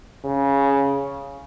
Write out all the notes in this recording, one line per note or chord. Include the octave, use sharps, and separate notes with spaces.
C#3